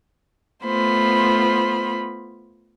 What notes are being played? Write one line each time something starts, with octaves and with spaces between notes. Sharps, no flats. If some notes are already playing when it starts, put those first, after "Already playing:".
A3 B3 F4 C5 B5